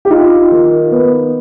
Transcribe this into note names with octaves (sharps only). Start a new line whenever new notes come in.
G4
D#4 F4
D#3
B3